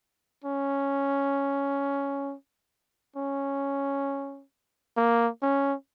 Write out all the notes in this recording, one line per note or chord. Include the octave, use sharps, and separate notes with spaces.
C#4
C#4
A#3
C#4